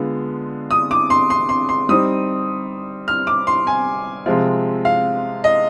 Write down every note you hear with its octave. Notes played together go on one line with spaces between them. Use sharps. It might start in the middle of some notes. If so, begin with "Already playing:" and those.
Already playing: D3 G#3 B3 F4
D#6
D6
C6
C6
C6
C6
G3 C4 D#4 D#6
F6
D6
C6
G#5
C3 F3 G#3 C4 F4
F5
D#5